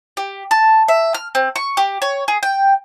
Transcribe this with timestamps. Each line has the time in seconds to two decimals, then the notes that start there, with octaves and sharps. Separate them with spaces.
0.17 G4
0.51 A5
0.88 E5
1.14 F6
1.35 C4
1.56 C#6
1.77 G4
2.02 C#5
2.28 G#4
2.43 G5